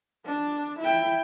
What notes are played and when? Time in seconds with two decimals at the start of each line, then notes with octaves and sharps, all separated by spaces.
0.25 D4
0.80 E4 G5